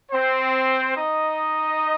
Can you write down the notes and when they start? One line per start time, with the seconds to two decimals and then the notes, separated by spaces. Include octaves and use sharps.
0.12 C4 C5
0.96 D#4 D#5